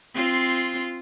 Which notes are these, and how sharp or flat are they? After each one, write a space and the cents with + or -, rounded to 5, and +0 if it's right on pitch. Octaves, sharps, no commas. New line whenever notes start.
C4 +5 F4 -10